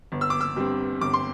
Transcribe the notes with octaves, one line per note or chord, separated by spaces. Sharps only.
G1
E6
D6
E6
G2 G3 C4
G1 D6
C6